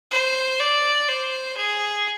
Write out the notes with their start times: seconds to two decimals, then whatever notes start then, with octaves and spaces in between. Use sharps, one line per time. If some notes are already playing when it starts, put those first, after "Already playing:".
0.11 C5
0.60 D5
1.08 C5
1.57 G#4